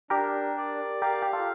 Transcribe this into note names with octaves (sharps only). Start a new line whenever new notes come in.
D4 G4 A#4
D5
G4 A#4 F5
G4
F4 A4